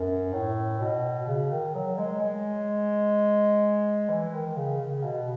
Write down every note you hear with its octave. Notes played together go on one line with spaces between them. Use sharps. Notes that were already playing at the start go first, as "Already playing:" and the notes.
Already playing: F#2
A2
B2
C#3
D#3
F#3
G#3
G#3
E3
D#3
C#3
C#3
B2